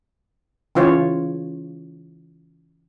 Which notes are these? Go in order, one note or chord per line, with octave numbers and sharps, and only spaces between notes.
C#3 E3 F4 C5 C#5